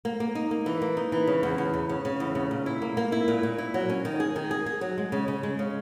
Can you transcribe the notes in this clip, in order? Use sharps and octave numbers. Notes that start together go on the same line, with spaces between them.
A#3
A#3
D#4
A#3
E3
A#3
D#4
E3
C#3
E2
E2
C#3
C#3
C#3
E2
C#3
A#2
E4
A#3
A#3
E4
A#2
A#2
E4
F#3
C#4
D#3
G#4
D#3
G#4
G#4
F#3
G#3
C#3
C#3
G#3
C#3